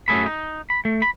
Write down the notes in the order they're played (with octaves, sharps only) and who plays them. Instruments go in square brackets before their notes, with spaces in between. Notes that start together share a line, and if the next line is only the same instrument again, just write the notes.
[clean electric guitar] F#2 F#3 A3 G#4 A4 B5
D#4
B5
A3
B5